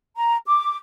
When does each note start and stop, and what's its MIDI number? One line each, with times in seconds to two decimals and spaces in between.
0.17 0.38 82
0.47 0.77 86